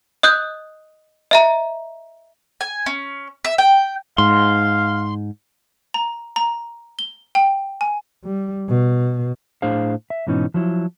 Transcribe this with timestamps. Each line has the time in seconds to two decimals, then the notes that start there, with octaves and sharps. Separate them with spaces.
0.23 D#5 D#6 F#6 G6
1.31 D#5 E5 A#5
2.61 G#5
2.86 C#4
3.45 E5
3.58 G5
4.18 G#2 F5 C6
5.94 A#5
6.36 A#5
6.99 G7
7.35 G5
7.81 G#5
8.25 G3
8.69 B2
9.62 A2 D4 G#4 C5 F5
10.10 E5
10.27 G#2 B2 E3 C#4 D#4
10.54 F3 F#3 E4